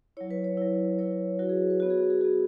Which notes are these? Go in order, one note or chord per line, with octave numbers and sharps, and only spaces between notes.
F#3 E4 C#5
B4
C#5
F#3 E4
F#3 E4 C#5
F#3 E4 F#4
G#4
B4
B3 F#4
G#4
F#4
G#4
B3 F#4 G#4